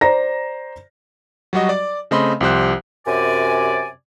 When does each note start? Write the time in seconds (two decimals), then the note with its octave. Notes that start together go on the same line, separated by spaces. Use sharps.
0.01 C5 D5 A#5 A#6
1.53 F#3 G3 F#4 D#5
1.69 D5 D6
2.11 C#3 A3 C4 D#5 B5 C6
2.41 C2 F3 G4 C5 F#6
3.07 F#2 C3 D5 G#5